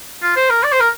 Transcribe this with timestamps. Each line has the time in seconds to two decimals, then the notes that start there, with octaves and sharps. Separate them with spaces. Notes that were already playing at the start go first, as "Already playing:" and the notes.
0.23 F4
0.37 C5
0.50 A#4
0.64 D5
0.72 C5
0.81 A#4